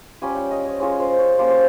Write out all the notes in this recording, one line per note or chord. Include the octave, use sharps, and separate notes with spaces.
G3 C#4 F4 G#5
G5
D#5
C#5
G#3 C#4 F4 C#5
C5
C#5
G3 A#3 C#4 C5
C5